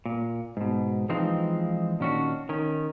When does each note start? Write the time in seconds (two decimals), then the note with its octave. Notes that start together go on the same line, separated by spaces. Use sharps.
0.06 A#2
0.57 G#2 B2
1.09 E3 F3 G#3 C4 D#4 F4
2.00 A#2 D#3 C#4 D4 F#4
2.49 D#3 C#4